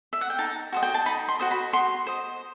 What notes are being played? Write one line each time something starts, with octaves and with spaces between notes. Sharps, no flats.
E5
F#5
G5
D#4 A5
F#4 C5 D#5
G5
A5
D#4 B5
C6
F#4 C5 D#5
B5
F#4 C6
C5 D#5